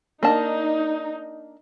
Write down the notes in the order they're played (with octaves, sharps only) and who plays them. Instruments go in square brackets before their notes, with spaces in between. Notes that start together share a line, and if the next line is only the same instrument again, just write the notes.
[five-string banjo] A#3 D4 A5 [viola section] D#4